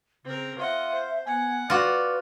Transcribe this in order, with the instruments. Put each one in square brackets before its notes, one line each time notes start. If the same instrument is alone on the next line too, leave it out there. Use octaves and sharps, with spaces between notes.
[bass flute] C#3 [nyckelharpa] C4 A#4
[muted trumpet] F4 [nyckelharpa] D#5 F#5 [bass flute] E5
[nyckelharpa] C5
[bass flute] B3 [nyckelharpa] F#5 [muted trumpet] G#5
[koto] F4 F#4 [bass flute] B4 [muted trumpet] D5